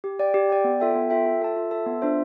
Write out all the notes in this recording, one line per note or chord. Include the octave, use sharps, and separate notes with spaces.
G4
D5 G5
G4
D5 G5
B3
F4 A4 E5 G5
B3
F4 A4 E5 G5
F4
A4 E5 A5
F4
A4 E5 A5
B3
D4 F4 C5 E5